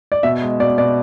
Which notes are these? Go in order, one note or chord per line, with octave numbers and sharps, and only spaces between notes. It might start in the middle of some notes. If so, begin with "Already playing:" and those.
D5
B2 E5
G#3
B2 D5
B2 D5